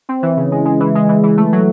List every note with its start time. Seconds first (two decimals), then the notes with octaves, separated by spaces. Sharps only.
0.09 C4
0.23 E3
0.37 C#3
0.52 G#3
0.65 G#3
0.80 E3
0.95 G#3
1.09 E3
1.23 E3
1.37 A3
1.53 F#3